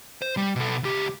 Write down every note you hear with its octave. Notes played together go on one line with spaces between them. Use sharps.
C5
G3
B2 A4
C#2 G4